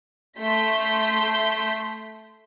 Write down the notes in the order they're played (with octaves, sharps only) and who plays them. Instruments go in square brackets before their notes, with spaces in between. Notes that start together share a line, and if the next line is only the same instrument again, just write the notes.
[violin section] A3 C6 G6 B6